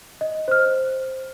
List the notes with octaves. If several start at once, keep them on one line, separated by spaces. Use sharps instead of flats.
D#5
C5 F6